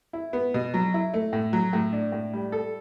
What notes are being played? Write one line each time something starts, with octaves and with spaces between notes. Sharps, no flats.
E4
B3
B2
F#3
E4
A3
A2
F#3
A2
D4
A2
G3
A4